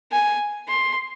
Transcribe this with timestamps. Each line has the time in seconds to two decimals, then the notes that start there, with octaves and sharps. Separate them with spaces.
0.12 G#5
0.69 C6